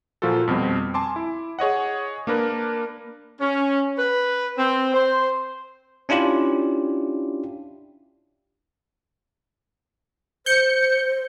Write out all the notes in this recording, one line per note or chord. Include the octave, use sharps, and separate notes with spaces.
A#2 F3 F4 F#4 A4
F2 B2 G3 C4
G#5 A5 C6 D6
E4
G#4 C#5 D#5 F#5
A#3 D4 A#4 B4
C#4
B4
C4
C5
C#4 D4 E4 F4 G4
C5 G6 C#7